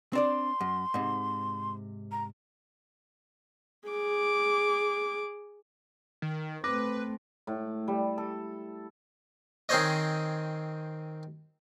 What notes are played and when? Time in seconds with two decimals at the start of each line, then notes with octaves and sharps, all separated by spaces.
0.13 C4 D4 D5 C6
0.61 F#2
0.94 G#2 C3
2.12 A#5
3.88 G#4 D6
6.22 D#3
6.64 A3 C4 B4 D6 A#6
7.47 A2
7.88 G3
8.18 A4
9.69 D#3 C4 G#4 C5 C#5 D#5